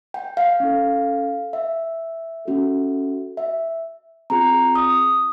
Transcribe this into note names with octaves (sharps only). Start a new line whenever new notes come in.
G5
F5
C#4 E4 A4
E5
C#4 F#4 A4
E5
C4 F4 G#4 A#5
D#6